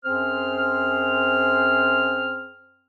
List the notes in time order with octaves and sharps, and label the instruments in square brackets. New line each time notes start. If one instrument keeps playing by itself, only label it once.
[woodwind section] F#2 C4 G#4 C5 F6